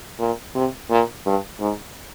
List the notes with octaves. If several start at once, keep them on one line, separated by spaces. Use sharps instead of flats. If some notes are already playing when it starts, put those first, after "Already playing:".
A#2
C3
A#2
G2
G#2